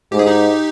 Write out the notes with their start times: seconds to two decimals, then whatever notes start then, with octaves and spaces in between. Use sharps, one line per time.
0.12 G#2 G4
0.19 G#4
0.27 D#4 G4